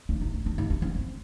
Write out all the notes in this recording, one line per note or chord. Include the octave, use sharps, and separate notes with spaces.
D4
D#4
D4
D4
D#4
D4
C#4
C4